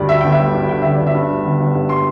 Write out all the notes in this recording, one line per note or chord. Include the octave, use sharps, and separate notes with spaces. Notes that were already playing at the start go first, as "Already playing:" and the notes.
Already playing: D2 G2 G3 D5
D3 E5
G1 G5
E5
G3
G2
D3 G5
G1 E5
D5
G1
E5
G2
G3
G1
G1
G2
G3 C6